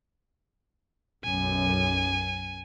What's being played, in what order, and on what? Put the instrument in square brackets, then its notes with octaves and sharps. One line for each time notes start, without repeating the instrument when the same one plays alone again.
[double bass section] B1 F#2 [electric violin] G#5